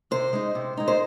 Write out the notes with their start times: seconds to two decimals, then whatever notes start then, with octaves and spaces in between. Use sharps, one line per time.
0.11 C3 C5
0.33 G#3 D#4
0.55 C3
0.77 G#3 D#4
0.88 C5